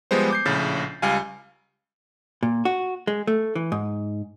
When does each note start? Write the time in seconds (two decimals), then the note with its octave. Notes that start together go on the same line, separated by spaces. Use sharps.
0.11 F3 G3 G#3 B3 C5
0.30 D6 G6 C7
0.45 A#1 A2 C#3 A6
1.02 C#2 G3 F5 G#5
2.43 A#2
2.65 F#4
3.07 G#3
3.27 A3
3.55 E3
3.72 G#2